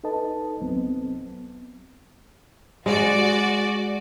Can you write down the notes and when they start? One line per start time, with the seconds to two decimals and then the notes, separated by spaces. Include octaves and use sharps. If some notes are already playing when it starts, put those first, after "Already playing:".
0.04 D#4 A4 B4 D#5 A5
0.61 C2 F#3 B3 C4
2.86 G#3 F#4 D5